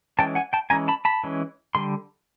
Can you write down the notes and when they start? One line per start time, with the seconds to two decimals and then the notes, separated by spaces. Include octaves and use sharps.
0.19 E3 G#3 C#4 G5 A5
0.35 F#5 G#5
0.53 G5 A5
0.70 E3 G#3 C#4 G#5 A#5
0.88 A5 B5
1.05 A5 B5
1.24 E3 G#3 C#4
1.75 D3 G3 C6